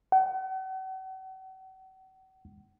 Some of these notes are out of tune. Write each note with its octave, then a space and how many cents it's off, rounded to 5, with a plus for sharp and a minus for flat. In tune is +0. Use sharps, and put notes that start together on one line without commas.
F#5 +40